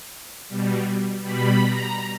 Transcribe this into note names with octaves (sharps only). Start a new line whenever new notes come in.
B2 G3
B2 G3 B5
A#5